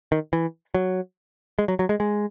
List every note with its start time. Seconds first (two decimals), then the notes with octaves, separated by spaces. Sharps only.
0.12 D#3
0.33 E3
0.74 F#3
1.59 G#3
1.68 F#3
1.79 F#3
1.89 G#3
2.00 G#3